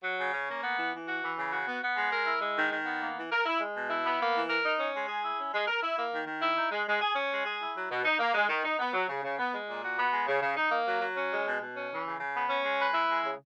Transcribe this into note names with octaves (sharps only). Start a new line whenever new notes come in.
F#3
C#3
C#4
A#3
B3
E3
E3
F#4
E3
C#3
F#4
B3
B3
G#3
A#4
E4
G#3
D#3
D#3
B3
A#3
E3
A#4
E4
G#3
B2
E4
B3
A#3
E3
A#4
D#4
C#4
G#3
G#4
E4
C#4
G#3
A#4
E4
A#3
D#3
D#3
E4
D#4
G#3
G#3
G#4
C#4
G#3
G#4
E4
F#3
B2
D#4
A#3
G#3
D#3
D#4
B3
F#3
C#3
C#3
B3
G#3
A#2
F#4
B3
G#3
C#3
C#3
D#4
A#3
F#3
F#3
C#4
G#3
B2
B2
C#4
E3
C#3
C#3
B3
C#4
G#3
B4
E4
G#3
C#3